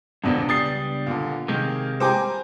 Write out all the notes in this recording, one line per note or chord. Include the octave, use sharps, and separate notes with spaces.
D#1 A#1 E2 G2 B2 D3 B3 D4
C#2 G3 D#6 A6 C7
A#2 D3
C3 D#3 G#3 A#3
G3 C5 G5 G#5 A#5 D6